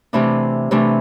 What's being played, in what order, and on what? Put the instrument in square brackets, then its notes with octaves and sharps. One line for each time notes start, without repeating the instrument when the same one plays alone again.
[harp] C3 E3 A3 D4
C3 E3 A3 D4